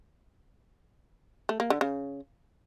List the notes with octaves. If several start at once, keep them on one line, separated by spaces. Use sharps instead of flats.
A3
A#3
D3
C#3